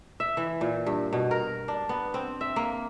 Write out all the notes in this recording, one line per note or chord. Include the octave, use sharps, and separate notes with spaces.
E5
E3
A#2
G2
B2
A#4
D4
B3
C4
E5
A#3